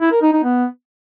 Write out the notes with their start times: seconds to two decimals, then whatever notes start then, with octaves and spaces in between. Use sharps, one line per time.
0.01 E4
0.12 A#4
0.22 D#4
0.33 D#4
0.44 B3